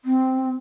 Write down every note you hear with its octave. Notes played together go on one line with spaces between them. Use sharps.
C4